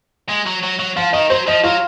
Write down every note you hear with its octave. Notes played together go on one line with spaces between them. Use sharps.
G#3
F#3
F#3
F#3
F3 F5
D#3 D#5
F#3 C5
F3 D#5
F#3 F4